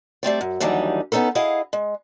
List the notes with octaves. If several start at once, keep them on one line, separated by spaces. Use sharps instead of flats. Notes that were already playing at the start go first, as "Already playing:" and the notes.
G3 A3 C4 D5
F#2
D#2 D3 E3 F#3 G3 D#4
B3 C#4 D#4 A4 A#4
E4 G#4 D#5 F5 F#5
G#3